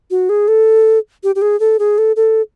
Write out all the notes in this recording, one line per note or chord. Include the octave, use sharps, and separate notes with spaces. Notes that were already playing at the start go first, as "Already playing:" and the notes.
F#4
G#4
A4
G4
G4
G#4
A4
G#4
A4
A4